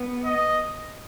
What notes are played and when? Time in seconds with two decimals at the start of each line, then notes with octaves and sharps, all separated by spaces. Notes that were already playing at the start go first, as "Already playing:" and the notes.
Already playing: B3
0.25 D#5